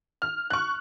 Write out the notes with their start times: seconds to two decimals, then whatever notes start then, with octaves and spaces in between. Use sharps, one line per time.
0.22 F6
0.50 C#6 F#6